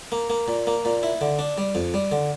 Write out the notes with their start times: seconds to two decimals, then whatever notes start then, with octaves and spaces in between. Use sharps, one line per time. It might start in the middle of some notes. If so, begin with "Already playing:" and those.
0.12 A#3
0.30 A#3
0.48 A#2
0.67 A#3
0.85 A#2
1.03 E4
1.21 D3
1.39 D4
1.58 G3
1.75 F2
1.94 G3
2.12 D3